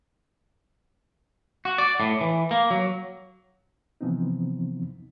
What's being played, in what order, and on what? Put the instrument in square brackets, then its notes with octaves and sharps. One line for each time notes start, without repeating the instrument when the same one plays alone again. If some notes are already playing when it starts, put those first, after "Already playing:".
[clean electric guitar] F#4
D5
A2
E3
A#3
F#3
[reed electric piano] C3 E3 F3 B3 C4 D#4